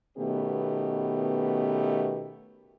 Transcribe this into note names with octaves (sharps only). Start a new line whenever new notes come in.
B2 D#3 A3 B3 C#4 G4